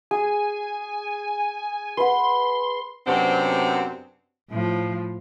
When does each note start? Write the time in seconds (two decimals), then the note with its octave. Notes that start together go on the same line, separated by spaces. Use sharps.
0.11 G#4 G#5
1.97 B4 F#5 C6
3.07 F#2 C3 F#3 B3 C4 D4
4.50 A2 F3